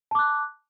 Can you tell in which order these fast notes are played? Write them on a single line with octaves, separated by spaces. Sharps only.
A5 D6 F#6